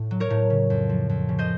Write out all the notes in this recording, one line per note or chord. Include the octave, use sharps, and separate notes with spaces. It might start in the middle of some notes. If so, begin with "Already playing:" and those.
Already playing: A2
F#3
A#4 C#5
A2
C#3
F2
F3
F2
C#3
C5 D#5